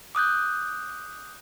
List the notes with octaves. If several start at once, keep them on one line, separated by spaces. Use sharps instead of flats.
D6 D#6 F#6 G6